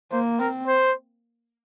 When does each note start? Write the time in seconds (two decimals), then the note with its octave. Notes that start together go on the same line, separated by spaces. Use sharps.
0.11 A#3 C5
0.39 C4 A#4
0.67 C5